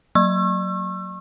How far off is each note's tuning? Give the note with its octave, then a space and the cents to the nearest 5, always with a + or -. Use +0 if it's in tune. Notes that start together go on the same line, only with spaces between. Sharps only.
F#3 +0 C#6 -30 E6 +30